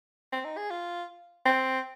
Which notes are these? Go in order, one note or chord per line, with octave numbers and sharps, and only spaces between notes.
C4
D#4
G#4
F4
C4